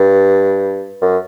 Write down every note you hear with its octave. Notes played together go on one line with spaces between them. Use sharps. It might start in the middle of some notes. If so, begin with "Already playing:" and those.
Already playing: G2
F#2